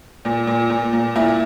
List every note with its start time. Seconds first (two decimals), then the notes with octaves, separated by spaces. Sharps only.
0.25 A#2
0.47 A#2
0.70 A#2
0.93 A#2
1.15 A#2 E4